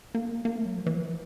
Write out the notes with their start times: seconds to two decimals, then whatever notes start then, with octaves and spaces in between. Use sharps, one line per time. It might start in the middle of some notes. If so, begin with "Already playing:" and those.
0.15 A#3
0.45 A#3
0.56 A3
0.66 F#3
0.76 F3
0.86 E3
0.95 F3